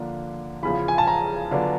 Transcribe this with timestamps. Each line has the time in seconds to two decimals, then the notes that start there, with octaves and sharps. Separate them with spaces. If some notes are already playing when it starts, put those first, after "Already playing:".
Already playing: D3 F3 A#3 D4
0.63 E2 C#3 F3 B5
0.88 G#5
0.98 A5
1.07 A#5
1.51 D3 F#3 B3 D4 F4